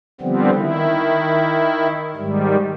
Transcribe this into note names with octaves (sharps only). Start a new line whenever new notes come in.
D3 F3 G3 B3 C4
D#3 E4
G#2 D#3 G3